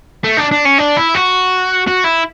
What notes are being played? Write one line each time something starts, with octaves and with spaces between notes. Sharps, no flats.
A3
D4
D4
C#4
D4
E4
F#4
F#4
E4